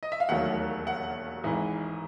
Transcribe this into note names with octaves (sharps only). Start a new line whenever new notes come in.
D#5
E5
F5
E1 D#2 D#3 F#3 A3 F#5
F#5
G#1 G#2 E3